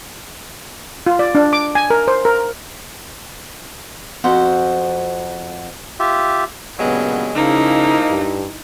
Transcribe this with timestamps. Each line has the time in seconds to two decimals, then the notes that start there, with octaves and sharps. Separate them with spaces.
1.06 F4
1.19 D5
1.35 D4
1.53 D6
1.75 G#5
1.90 A#4
2.08 C5
2.25 A#4
4.24 F2 F#4 C5
6.00 F4 G4 E5
6.79 G2 A#2 C#3 F#3 G#3 B3
7.35 C#3 F3 G#3 A#3 D#4 E4
8.08 G2